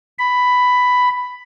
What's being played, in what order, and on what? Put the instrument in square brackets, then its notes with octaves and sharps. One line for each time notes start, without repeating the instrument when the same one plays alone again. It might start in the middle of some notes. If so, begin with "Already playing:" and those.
[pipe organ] B5